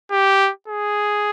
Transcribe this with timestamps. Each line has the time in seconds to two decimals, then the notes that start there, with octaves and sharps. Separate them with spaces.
0.11 G4
0.68 G#4